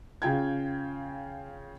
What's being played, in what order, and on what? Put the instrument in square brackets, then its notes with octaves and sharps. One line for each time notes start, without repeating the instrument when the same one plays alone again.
[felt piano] C#3 F4 G5 G#6